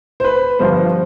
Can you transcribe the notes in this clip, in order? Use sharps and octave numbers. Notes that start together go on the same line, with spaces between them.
C5
B4
G1 G2 F3 B3 C5